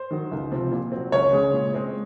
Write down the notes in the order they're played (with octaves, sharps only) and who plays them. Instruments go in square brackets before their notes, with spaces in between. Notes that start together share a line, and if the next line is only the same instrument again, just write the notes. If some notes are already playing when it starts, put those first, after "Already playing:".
Already playing: [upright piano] C5
D#3 F#3
C#2
C3 F3 C4
A#2
F#3 C4
C#2 C#5
C#3 G#3
A#2
G#3 C4